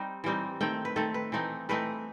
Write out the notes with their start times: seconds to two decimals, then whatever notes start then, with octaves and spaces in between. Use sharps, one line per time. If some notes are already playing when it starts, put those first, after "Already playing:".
Already playing: G3 C4 D#4 G5
0.24 E3 G3 C4 D#4
0.61 D#3 A3 C4 G5
0.85 B4
0.96 D#3 A3 C4 A4
1.14 B4
1.32 E3 A3 C4 D#4
1.69 E3 A3 C4 D#4 B4